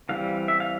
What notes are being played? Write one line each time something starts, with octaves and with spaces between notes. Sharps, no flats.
E3 G3 C4 F5
E5
F5